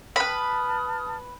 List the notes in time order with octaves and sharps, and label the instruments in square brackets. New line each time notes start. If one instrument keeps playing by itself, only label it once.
[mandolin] B4 B5 [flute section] A5 D#6 F6